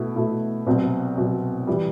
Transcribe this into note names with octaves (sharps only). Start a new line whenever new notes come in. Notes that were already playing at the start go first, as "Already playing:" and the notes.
Already playing: B2 A3 E4
B2 A3 E4
C2 B2 F#3 C4
C2 B2 F#3 C4
E3 G3